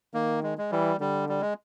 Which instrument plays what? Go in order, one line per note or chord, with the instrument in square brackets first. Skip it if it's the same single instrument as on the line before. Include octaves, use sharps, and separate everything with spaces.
[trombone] D#3 [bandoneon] A#3
[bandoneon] G#3
G#3
[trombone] E3 [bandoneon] G3
[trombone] D3 [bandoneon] G3
[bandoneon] G3
G#3